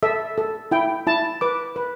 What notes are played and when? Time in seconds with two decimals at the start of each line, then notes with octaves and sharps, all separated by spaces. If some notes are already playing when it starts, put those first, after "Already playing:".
0.03 A4 E5
0.38 A4
0.71 E4 G5
1.07 E4 A5
1.41 B4 D6
1.76 B4